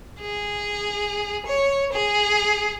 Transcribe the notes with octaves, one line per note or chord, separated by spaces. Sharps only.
G#4
C#5
G#4